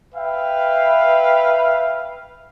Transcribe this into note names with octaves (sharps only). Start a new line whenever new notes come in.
B4 E5 F5 G5